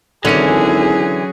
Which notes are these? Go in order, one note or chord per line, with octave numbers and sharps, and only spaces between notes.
G#1 D3 E3 F#3 C#4 G#4